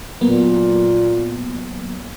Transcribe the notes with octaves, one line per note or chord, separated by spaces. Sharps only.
A#2 F#3 A#3 B3